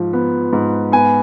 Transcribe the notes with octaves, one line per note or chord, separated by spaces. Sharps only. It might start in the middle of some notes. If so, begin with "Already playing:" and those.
Already playing: G#2 F3
B3
G#2
B3 G#5